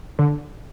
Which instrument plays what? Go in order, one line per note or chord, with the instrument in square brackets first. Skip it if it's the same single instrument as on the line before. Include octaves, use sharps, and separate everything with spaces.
[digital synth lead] D3